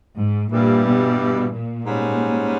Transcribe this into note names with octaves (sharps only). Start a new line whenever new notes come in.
G#2
G2 A#2 E3 G3
B2
A#2
G#2 G3 C#4